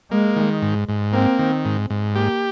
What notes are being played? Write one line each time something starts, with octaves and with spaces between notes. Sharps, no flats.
G#3 A#3
D#3
G#2
G#2
A#3 C4
D#3
G#2
G#2
A#3 G4